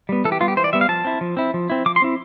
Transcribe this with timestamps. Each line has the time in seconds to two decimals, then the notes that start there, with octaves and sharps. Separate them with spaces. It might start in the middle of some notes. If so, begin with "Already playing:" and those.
0.09 G3 B3
0.25 E3 A4
0.32 G4
0.40 G3 B3 F4
0.48 G4
0.57 E3 C5
0.64 D5
0.73 G3 B3 E5
0.81 F5
0.89 F3 A5
1.05 C4 E4
1.21 F3
1.37 C4 E4
1.54 F3
1.70 C4 E4
1.86 F3 D6
1.96 C6
2.02 C4 E4